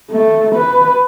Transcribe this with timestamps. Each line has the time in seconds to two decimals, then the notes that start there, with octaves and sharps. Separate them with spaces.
0.11 A3
0.55 B4